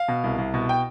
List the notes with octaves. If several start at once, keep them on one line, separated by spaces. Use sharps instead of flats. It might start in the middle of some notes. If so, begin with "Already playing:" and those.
Already playing: F5
B2
C2
C2
B2
G5